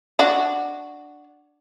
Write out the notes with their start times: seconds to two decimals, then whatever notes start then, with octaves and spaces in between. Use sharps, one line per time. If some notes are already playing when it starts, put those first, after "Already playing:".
0.19 D4 F#4